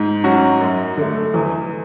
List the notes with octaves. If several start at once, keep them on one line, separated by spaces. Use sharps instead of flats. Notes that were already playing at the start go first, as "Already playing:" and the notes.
Already playing: G#2
F#3 C#4 F#4
F#2
D3 A3
E2